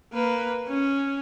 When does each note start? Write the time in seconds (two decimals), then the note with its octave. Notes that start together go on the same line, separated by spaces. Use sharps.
0.13 A#3 B4
0.68 C#4